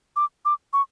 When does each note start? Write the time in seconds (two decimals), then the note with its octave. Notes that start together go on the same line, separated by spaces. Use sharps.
0.16 D6
0.45 D6
0.73 C#6